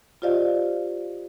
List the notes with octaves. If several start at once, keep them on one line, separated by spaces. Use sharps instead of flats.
F4 G4 C5 D5 D#5 F5